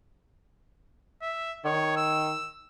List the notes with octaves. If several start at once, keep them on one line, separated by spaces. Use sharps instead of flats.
E5
D#3 C#5
E6